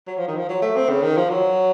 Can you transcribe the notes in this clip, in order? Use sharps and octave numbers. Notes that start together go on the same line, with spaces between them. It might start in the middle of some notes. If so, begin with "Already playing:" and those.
F#3
F3
D#3
F3
F#3
A3
C4
C#3
D#3
F3
F#3